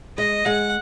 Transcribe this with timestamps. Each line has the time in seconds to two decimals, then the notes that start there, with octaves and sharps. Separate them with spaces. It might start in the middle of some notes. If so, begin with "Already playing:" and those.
0.17 G#3 D#5
0.46 G#3 F#5